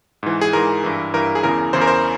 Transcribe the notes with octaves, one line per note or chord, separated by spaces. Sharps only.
G#2 E3
G#4
G#2 E3 A#4
G2 E3
G2 E3 A#4
G#4
E2 C#3 E3 A#4
E2 C#3 E3 C5
A#4
C5